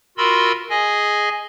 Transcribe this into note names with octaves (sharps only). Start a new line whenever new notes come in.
F4 F#4 A#4 B5 C6 E6
G#4 D#5 G#5